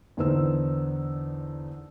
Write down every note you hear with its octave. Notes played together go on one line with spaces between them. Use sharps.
E2 D3 D#4 B4 C5 E6